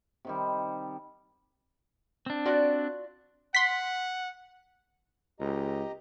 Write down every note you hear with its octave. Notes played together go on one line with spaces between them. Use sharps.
C3 D#3 G3
C4 D4
F4 F#4 D5
F#5 C6 B6
C#2 G4 D#5 A#5